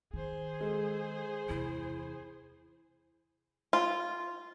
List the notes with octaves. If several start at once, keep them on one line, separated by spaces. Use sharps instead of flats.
D#3 G#4 C5
G#3 A4
E2 C3 E4
F4